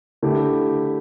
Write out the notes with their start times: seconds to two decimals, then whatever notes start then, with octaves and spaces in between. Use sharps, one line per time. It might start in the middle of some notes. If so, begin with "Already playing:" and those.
0.22 D3 A3 E4 G4